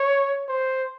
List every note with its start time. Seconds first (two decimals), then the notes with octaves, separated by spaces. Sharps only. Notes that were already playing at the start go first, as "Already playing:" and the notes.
Already playing: C#5
0.48 C5